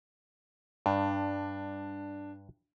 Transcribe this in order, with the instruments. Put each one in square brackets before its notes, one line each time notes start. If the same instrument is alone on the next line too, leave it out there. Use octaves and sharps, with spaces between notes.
[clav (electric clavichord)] G2 [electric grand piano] D4